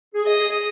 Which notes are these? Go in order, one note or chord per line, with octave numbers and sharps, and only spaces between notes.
G#4
D#5
G#4